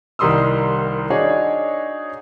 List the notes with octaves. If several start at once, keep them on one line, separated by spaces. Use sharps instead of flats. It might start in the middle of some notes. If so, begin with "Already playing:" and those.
C2 D#3 G3 C6 D#6 E6
D4 D#4 F#4 G#4 C#5